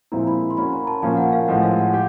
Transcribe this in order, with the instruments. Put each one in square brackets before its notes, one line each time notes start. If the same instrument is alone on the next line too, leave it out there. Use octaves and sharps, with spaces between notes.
[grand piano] A#2 F3 G#3 C4 E4 [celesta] A#5
[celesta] B5
C6
[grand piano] A#3 C#4 F#4 [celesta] B5
[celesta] A#5
A5
[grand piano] A#2 F3 A#3 C#4 [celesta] G#5
[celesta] F#5
F5
[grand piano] A2 F3 G#3 [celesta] F#5
[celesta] F5
F#5
[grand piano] G4 [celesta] F#5